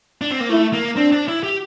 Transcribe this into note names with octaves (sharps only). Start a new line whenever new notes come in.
D4
C4
A#3
A3 E4
A#3
C4 D4
D4
E4
G4